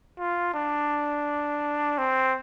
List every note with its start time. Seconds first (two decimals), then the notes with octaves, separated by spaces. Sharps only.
0.19 F4
0.54 D4
1.98 C4